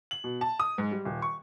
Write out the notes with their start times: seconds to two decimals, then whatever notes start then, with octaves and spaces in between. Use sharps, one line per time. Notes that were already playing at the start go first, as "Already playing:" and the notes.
0.11 F#7
0.24 B2
0.41 A5
0.60 D#6
0.78 G#2
0.92 G3
1.05 D#1
1.22 C#6